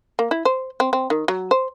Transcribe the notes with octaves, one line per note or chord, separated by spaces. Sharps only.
A#3
E4
C5
C4
C4
D#3
F#3
C5